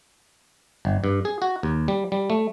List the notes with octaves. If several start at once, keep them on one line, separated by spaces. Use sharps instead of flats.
G1
G2
G#4
F#4
D#2
G3
G3
A3